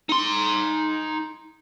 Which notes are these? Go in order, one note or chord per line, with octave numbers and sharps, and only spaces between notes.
D#4 C6